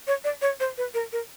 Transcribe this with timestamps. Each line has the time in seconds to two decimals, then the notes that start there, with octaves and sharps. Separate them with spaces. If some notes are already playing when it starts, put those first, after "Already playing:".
0.07 C#5
0.24 D5
0.42 C#5
0.60 C5
0.78 B4
0.94 A#4
1.13 A#4